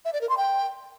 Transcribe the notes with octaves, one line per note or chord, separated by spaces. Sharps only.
E5
D5
A#4
C6
G5